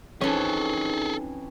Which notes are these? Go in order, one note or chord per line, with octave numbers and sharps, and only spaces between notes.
F2 E3 C#4 D#4 G#4 A4